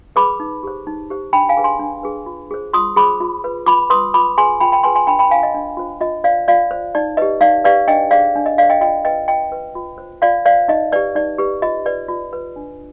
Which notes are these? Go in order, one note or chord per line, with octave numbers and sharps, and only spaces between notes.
G#4 B4 B5 D6
D#4
G4 C5
D#4
G4 C5
D4 G5 B5
F5 G#5
G#4 B4
G#5 C6
D4
G#4 B4
F4
G#4 C5
F4 C6 D#6
G#4 C5 B5 D6
F4
B4
F4 B5 D6
B4 C6 D#6
F4 B5 D6
G#4 B4 G#5 C6
F4 G5 B5
G5 B5
G#4 B4 G#5 C6
G#5 C6
D4 G5 B5
G5 B5
F4 C5 F5 G#5
D#5
D4
F4 C5
F4 D#5
C5 D5 F5
F4 D5 F5
C5
D#4 D5
G4 B4 D#5
D#4 D5 F5
G4 B4 D5 F5
D4 D#5 G5
G#4 C5 D5 F5
D4
D#5
G#4 C5 D5 F5
D#5 G5
F4 D#5 G5
B4 D#5 G5
F4 D#5 G5
B4
F4
C5
F4 D5 F5
C5 D5 F5
D#4 D#5
G4 B4 D5
D#4 D5
G4 B4
F4 D#5
B4 D5
F4
B4
D4